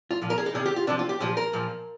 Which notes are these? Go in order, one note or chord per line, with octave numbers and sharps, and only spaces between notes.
F4
A#2 F3
A#4
G#4
D#4
C3 D#3 G#4
G4
F4
C3 F3 D4
F4
G4
A#2 F3 G#4
A#4
A#2 F3